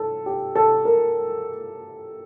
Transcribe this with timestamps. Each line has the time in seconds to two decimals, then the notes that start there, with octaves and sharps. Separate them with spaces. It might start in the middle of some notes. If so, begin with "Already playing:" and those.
Already playing: A4
0.26 G4
0.55 A4
0.85 A#4